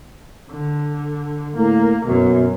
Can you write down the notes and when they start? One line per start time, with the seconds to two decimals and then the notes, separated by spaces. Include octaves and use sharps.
0.51 D3
1.57 A2 A#3
2.06 F#2 B2